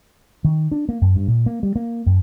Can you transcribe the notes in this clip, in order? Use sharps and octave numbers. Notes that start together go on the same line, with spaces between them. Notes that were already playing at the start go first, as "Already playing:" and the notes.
D#3
D4
A#3
F#2
G2
A#2
A#3
G3
A#3
F#2